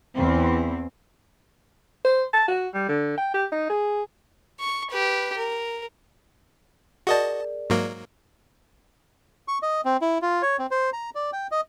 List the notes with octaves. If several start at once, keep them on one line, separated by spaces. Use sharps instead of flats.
E2 C4
C5
A5
F#4
G3
D3
G5
G4
D#4
G#4
C#6
G4 B4
A#4
F#4 G#4 A#4 D5 D#5 A5
G#2 F#3 A#3
C#6
D#5
C4
E4
F4
C#5
C4
C5
A#5
D5
G5
D#5